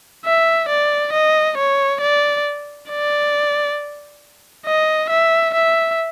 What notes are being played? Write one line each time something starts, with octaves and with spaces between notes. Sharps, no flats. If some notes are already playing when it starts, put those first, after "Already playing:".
E5
D5
D#5
C#5
D5
D5
D#5
E5
E5